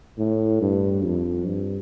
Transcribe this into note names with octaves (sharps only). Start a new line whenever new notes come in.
A2
G2
F2
G2